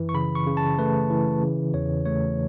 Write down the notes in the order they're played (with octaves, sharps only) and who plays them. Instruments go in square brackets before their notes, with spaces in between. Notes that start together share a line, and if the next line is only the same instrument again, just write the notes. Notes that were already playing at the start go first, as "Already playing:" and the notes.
Already playing: [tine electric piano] F#2 E3
C#6
C#3 B5
C#6
C#3
A5
A3 B4
E3
C#3
E2 C#5
A3 C#5